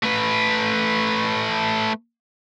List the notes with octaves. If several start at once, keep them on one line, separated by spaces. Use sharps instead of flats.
A3 B4